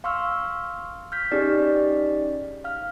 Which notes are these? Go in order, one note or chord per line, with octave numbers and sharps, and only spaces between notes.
F5 C6 C#6 E6 F6
F6 G6 B6
C#4 D#4 G4 G#4 D5
F5 F6